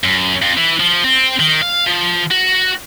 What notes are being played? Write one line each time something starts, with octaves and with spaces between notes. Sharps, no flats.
F#2
F2
E3
F3
C4
D#3
F5
F3
F#4